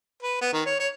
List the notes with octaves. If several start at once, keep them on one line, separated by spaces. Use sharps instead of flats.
B4
B3
D#3
C#5
C#5